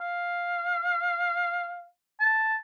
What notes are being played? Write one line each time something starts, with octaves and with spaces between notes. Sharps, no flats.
F5
A5